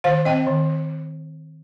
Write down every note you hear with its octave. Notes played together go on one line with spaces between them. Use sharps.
D#3 C5 F5
C4 D#5 G5
D#3